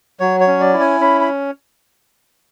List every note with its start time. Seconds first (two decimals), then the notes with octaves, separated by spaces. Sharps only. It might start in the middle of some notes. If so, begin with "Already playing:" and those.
0.20 F#3 C#5
0.40 C#5
0.47 C#4
0.60 D5
0.74 E4
0.80 G#5
1.00 C#4 B5
1.21 B5